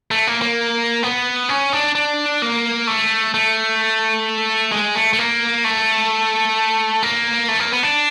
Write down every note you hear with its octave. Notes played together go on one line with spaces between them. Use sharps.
A3
A#3
A#3
B3
C#4
D4
D4
A#3
A3
A3
G#3
A3
A3
A#3
A3
A#3
A3
A#3
B3
D4